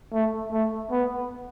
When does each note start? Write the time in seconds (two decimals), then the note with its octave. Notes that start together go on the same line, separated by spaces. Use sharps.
0.13 A3
0.52 A3
0.91 B3